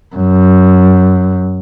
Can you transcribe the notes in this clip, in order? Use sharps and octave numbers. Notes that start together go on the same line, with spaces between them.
F#2